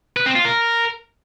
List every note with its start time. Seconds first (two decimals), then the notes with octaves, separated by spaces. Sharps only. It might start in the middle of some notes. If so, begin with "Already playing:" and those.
0.17 B4
0.26 C4
0.36 F4
0.45 A#4